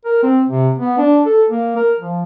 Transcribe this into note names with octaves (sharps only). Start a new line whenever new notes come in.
A#4
C4
C3
B3
D4
A4
A#3
A#4
F3